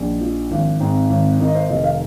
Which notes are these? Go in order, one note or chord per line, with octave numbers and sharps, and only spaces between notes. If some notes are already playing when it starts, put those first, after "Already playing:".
Already playing: A#1 D#4
F3
G#1
G#2 C4
G#1
D#3 D#4
D#5
C5
F1 D#5
F5